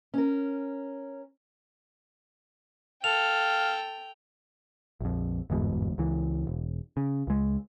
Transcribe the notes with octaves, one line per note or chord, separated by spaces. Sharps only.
C#4 A#4
A4 F5 G5 F7
A#1 F2
G1 E2 G#2 B2
C#2 E3
E1
C#3
C#2 G#3